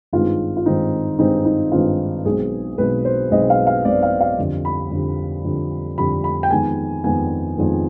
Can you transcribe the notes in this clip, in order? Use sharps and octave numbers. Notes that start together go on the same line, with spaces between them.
G#1 G2 D#3 G#3 C4 F4
F4
G#1 G2 D#3 G#3 C4 D#4
G#1 G2 D#3 G#3 C4 D#4
D#4
G#1 G2 D#3 G#3 C4 F4
B1 B2 G#3 C4 G#4
B1 B2 G#3 C4 B4
C5
B1 B2 G#3 C4 D#5
F5
F5
B1 B2 G#3 C4 D5
F5
F5
F2 D3 G3
B5
F2 D3 G3
F2 D3 G3
F2 D3 G3 B5
B5
G5
F2 D#3 G#3 B3 G#5
F2 D#3 G#3 B3 G#5
F2 D#3 G#3 B3